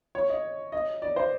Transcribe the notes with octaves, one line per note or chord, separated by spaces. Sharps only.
C#5
D#5
D#5
D5
C5